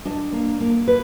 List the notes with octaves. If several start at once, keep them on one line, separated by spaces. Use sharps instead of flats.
D4 D#5
A#3
A#3
B4